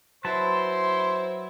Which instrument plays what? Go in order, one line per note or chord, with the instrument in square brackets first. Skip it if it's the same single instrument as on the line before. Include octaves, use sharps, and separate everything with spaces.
[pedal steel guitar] F#3 B4 A5 [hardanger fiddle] E4 [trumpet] C5 [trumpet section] C6